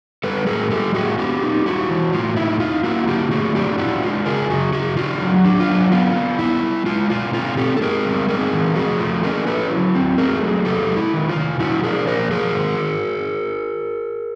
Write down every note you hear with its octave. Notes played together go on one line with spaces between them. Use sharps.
G3 A4 B4
A2 G#4 A#4
G3 G4 A4
A2 F#4 G#4
B3 F4 G4
D#4
G3 E4 F#4
E3
A2 F4
D#4 E4
D#4 F4
A#3 E4 F#4
D3 F4 G4
A3 F#4 G#4
D4 F4 G4
D4 E4 F#4
G#3 F4
C#3 G#4 A#4
C#3 F#4 G#4
C#3 F#4 G#4
D4 F4 G4
F#3
D4
F4
F#3
B3 F4
B3
G3 E4
G3
G#3 F4
B2 F4
C4 F4
C4 G4 A4
A4
C4 G#4 A#4
G3
C4 G#4 A#4
E3
F3 F#4 G#4
A3 F4
C#4 G#4 A#4
E4 A4 B4
F#3
C4
A3 G#4 A#4
F#3
C3 G4 A4
G#3
E4
D#3
F4
C3
F3 E4 F#4
D4 G#4 A#4
F3 A#4 C5
F3 G#4 A#4
D#3